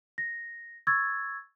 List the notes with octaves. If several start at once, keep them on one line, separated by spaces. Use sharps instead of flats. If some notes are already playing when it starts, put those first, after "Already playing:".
A#6
C#6 E6 G#6 A6